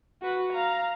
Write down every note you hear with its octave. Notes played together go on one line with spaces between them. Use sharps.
F#4 B4
F5 A#5